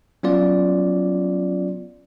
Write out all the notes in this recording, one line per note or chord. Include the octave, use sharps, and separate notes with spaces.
F#3 B3 C#4 F4 D5